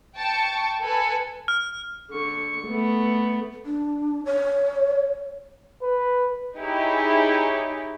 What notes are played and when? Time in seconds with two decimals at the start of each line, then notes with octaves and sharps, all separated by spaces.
0.16 G5 A5 C#6
0.81 A4 B4 G#5
1.48 F6
2.11 D3 C#6
2.67 A3 B3
3.66 D4
4.26 C#5
5.82 B4
6.58 D#4 E4 G4 G#4 C#5